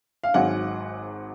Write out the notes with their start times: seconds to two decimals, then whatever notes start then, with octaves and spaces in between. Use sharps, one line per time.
0.24 F5
0.34 G#1 G#2 F#3 F#5